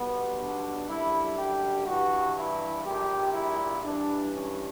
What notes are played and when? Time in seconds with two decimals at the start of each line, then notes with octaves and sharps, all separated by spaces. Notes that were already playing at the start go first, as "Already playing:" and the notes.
Already playing: B1 B2 G3 B3
0.39 D4
0.88 F#2 D3 G3 E4
1.38 G4
1.86 G2 E3 G3 F#4
2.36 E4
2.85 A#1 A#2 G3 G4
3.34 E4
3.83 G2 E3 G3 D4
4.33 C#4